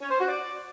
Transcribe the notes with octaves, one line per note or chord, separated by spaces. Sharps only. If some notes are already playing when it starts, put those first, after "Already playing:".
C#4
C5
F#4
D5